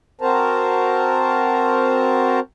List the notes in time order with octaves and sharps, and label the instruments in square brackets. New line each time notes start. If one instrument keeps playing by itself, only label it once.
[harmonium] C4 F#4 A#4 C5 A5 A#5